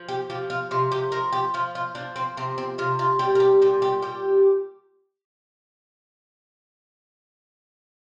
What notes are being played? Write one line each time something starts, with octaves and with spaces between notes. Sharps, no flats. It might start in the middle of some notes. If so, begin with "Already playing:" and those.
Already playing: F3
G4
F3 G4
F4
C3 F4
G4
F3 A#4
G4
F3 F4
F4
F3 D4
C4
C3 C4
C4
C3 F4
F4
G3 G4
A#4
G4
A#2 G4
G4
G3 G4